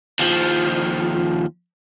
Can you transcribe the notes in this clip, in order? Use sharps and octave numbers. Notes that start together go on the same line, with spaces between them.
D#2 F3